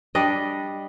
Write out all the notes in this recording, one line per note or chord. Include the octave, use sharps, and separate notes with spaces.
G3 D4 D5 D#5